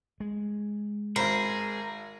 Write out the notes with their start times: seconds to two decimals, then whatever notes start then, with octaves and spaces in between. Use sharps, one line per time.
0.20 G#3
1.16 G#1 G#4 A#4 C5 B5